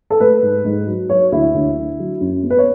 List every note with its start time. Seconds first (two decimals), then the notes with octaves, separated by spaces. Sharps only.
0.10 A4
0.20 A3 B4
0.43 G#2
0.65 G#2
0.87 F#3
1.09 F#3 C#5
1.32 D2 E4
1.54 D2
1.76 D3
1.99 F#3
2.21 F#2
2.43 B3
2.50 B4
2.58 C#5